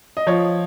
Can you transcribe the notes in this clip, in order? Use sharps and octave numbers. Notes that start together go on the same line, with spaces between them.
D#5
F3 C#5